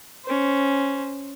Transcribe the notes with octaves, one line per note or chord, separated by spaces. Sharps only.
C#4 C5